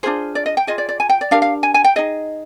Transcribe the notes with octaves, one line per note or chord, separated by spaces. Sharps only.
D4 F4 G#4 C5
D5
D#5
G5
F4 G#4 D#5
D5
D5
G#5
G5
D5
D4 G4 A#4 F5
F5
G#5
G#5
G5
D#4 G#4 D#5